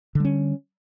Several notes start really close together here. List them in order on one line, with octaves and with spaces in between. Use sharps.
D3 G3 C#4